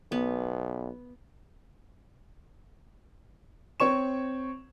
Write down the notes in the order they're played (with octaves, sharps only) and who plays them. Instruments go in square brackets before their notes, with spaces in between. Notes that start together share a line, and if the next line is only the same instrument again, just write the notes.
[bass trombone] B1 [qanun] B3
[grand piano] C4 C#5 C#6 E7